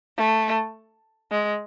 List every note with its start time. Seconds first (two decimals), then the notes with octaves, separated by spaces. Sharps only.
0.17 A3
1.31 G#3